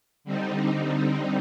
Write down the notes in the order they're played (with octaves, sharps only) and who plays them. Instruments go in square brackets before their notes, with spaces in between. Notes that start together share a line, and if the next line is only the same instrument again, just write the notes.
[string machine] D3 G3 C4 D#4